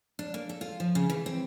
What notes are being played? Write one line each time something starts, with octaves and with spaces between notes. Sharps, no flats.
D4
A#3
A4
F4
F3
C#3
E3
C4